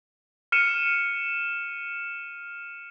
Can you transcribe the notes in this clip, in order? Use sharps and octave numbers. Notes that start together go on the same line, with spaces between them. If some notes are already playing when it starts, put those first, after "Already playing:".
F6 C#7 D#7 E7